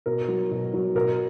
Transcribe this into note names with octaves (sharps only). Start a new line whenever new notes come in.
B2 A#4
F#3
B2
F#3
B2 A#4